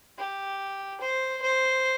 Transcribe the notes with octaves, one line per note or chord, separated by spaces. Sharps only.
G4
C5
C5